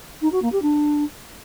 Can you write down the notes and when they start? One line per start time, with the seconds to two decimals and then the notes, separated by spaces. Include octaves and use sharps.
0.21 D#4
0.32 F#4
0.42 A#3
0.52 G4
0.62 D4